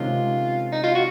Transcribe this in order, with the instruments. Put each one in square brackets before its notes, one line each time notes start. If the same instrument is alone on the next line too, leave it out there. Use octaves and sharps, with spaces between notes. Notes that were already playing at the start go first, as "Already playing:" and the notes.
Already playing: [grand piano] C3 D#3 G#3 C#4 [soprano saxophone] F4
[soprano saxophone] D#4
F4
F#4